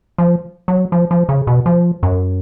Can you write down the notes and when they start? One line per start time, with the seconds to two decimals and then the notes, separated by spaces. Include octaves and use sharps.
0.18 F3
0.68 F#3
0.92 F3
1.11 F3
1.29 C#3
1.47 B2
1.66 F3
2.03 F#2